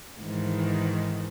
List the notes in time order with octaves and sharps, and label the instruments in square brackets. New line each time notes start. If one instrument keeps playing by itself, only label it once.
[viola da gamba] G#2 D#3 E3